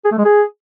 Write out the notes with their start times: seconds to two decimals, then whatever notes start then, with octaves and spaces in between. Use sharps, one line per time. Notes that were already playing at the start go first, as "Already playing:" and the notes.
0.05 G#4
0.12 A3
0.18 G#3
0.25 G#4